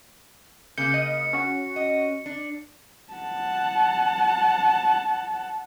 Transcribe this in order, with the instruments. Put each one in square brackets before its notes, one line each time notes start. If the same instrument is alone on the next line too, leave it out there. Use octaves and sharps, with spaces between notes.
[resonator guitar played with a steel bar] C#3 A#3 [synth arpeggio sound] G6 [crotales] C#7
[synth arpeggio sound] D#5
C#4 F#4
[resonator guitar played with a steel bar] D#5
D4
[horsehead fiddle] F#5 A5